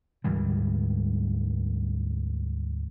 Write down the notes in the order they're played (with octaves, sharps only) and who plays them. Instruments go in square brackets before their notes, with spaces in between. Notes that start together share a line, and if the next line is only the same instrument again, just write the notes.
[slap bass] D2 G#2 E3 G3